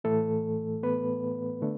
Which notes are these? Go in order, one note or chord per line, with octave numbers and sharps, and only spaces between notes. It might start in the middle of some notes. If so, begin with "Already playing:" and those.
A2 E3 A3 A4
B3 B4
D3 A3 D4